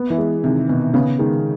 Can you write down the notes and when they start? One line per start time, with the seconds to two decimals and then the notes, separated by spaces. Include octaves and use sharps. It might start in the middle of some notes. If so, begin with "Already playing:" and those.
Already playing: B3
0.10 E3
0.18 G#3
0.44 C3 D#3
0.69 B2 D#3
0.94 C#3 B3
1.19 D#3 G#3